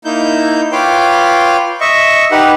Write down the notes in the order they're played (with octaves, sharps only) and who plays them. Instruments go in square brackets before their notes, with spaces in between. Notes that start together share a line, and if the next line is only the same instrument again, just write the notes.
[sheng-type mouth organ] A#3 D#4 E4 G6
F4 B4 C#5 G5 C6 D6
D#5 E5 C#6
D#4 G4 B4 F#5